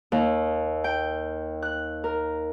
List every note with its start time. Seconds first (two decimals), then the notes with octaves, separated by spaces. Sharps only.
0.12 D#2
0.84 G5
1.62 F#6
2.04 A#4